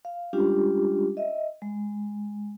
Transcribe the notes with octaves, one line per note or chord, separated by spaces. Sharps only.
F5
G3 G#3 C#4 D4 F4 G4
D#5 E5
G#3